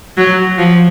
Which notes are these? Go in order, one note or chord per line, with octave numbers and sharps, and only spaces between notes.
F#3
F3